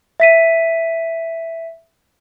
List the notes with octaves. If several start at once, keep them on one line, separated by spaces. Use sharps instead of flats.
E5 B6 D#7